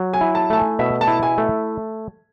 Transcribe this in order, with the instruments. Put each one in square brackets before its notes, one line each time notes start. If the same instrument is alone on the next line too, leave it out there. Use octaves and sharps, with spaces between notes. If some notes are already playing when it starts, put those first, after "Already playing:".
Already playing: [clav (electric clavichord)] F#3
[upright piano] G#5
[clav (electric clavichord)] E4
[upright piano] A5
[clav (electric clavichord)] A3 [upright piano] A5
[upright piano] G#5
[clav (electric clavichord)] B2 [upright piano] E5
[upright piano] A5
[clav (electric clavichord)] E4
[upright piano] G#5
[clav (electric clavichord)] A3